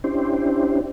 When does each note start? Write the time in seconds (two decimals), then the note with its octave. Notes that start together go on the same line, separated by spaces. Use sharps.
0.04 C#4 D4 E4 G4 C5